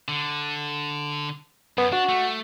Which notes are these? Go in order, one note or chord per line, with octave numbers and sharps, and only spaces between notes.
D3
F#2 B3
D4 F#4
A3